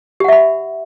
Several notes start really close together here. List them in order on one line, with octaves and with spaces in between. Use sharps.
G4 F#5 E5 B5